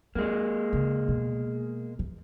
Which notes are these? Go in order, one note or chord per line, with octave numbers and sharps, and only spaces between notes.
G#3 A#3 D#4
C#3
B2
E3